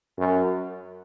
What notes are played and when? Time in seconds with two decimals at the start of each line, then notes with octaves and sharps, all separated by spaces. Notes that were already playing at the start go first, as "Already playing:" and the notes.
0.19 F#2